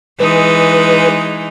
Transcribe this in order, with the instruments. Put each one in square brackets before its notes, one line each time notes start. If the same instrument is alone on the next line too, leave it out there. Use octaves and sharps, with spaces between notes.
[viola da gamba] E3 G#3 D#4 [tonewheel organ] B4